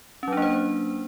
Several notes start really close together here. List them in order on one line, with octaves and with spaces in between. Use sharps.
C#4 F#3 D4 A#3 C5